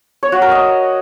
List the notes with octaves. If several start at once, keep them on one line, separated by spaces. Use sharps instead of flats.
C#5
F#4
A#4
D#5